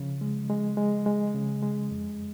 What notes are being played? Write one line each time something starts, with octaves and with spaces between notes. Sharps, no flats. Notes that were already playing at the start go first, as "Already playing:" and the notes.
Already playing: C#3 F3
G#3
G#3
G#3
G#3
C#3
G#3
F2